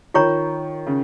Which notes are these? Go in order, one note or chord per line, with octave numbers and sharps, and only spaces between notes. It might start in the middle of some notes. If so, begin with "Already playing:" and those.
D#3 F4 C#5 A#5 C#6
C#3